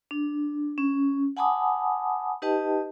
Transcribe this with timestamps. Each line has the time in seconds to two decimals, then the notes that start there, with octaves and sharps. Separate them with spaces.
0.11 D4
0.78 C#4
1.37 F#5 G#5 A5 B5 D6 D#6
2.42 D#4 G4 B4 D#5 G5 A5